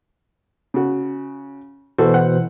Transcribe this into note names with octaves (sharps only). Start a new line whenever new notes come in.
C#3 F#4
B2 E3 F#4 A4 C5
F#5